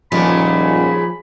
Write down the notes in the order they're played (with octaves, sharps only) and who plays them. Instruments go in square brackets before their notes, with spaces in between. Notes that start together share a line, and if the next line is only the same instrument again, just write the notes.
[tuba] D#1 [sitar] A#2 C#3 G#3 [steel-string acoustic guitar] F3 F4 [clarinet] B5